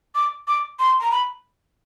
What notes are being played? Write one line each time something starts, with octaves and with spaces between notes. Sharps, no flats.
D6
D6
C6
A#5
B5